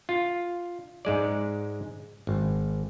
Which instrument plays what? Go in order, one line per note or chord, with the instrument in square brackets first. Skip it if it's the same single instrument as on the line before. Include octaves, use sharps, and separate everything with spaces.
[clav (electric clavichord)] F4
G#2 G#3 D5
G#1